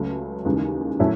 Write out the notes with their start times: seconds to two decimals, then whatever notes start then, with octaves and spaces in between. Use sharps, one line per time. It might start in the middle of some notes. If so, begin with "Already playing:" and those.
Already playing: C#2 C#3 F#3 A3
0.45 D#2 C#3 E3 G#3 D#4
0.99 A2 F#3 A3 C#4 E4